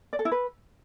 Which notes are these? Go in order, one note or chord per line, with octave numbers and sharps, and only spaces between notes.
D5
A4
E4
B4